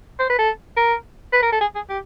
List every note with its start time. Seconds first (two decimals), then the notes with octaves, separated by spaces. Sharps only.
0.20 C5
0.30 B4
0.38 A4
0.76 A#4
1.33 B4
1.42 A#4
1.52 A4
1.61 G#4
1.75 G#4
1.89 G4